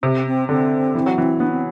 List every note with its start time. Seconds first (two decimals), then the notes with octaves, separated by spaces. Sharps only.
0.03 C3 C4
0.26 C4
0.48 D3 C4
0.95 E3
1.06 F#3
1.18 E3
1.40 B3 D4
1.51 C4